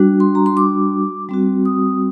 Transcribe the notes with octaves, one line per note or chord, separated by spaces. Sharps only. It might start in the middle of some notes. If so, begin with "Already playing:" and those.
Already playing: G3 D4 F#4
C6
A#5
C6
D6
G3 C4 F#4
D#6